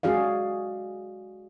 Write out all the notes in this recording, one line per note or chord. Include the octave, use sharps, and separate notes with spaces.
G#3 C#4 F#4 G#4 D5 F5